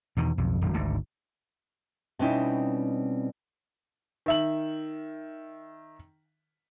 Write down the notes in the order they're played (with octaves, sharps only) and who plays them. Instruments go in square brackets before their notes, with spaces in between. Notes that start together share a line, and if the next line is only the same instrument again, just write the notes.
[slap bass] E2 B2 D#3
B1 F2
D#1 G#1 F#2
G#1 D2 G#2
[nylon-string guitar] B2 G3 C4 C#4 D#4 E4
[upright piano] D#3 E5 F#7